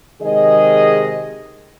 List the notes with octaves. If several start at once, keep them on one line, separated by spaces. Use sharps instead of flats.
C3 D#3 G#3 G#4 D#5